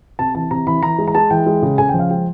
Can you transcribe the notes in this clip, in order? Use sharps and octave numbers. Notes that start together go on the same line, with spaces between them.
C3 A5
E3 A5
C3 A#5
E3 B5
E3 A#5
G#3
A#5
G#3 A5
E3 G5
G#3
C#3
C#3 G#5
G5
F3
F5
G#3 G5